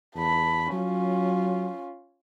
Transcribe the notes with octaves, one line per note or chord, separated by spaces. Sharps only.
E2 A5 B5
F#3 C#4 F4